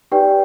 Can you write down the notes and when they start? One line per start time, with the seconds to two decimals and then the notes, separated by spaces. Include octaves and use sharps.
0.12 D#4 G4 B4 D5 G5